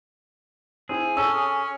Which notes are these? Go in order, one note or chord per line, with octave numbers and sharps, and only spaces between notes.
C4 E4 G#4
C#4 A4 A5 E6